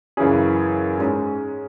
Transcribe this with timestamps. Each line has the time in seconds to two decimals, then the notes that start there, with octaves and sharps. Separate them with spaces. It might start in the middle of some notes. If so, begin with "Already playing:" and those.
0.17 F#2 C#3 E3 C#4 G#4
0.98 G#2 G#3 C#4